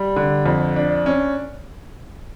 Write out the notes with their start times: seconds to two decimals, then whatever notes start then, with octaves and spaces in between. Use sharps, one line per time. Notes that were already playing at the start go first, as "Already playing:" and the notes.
Already playing: G3
0.16 D3
0.46 F2
0.76 D4
1.06 C#4